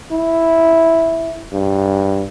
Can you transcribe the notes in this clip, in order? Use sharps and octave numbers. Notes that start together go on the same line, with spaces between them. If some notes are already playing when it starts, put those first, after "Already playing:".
E4
G2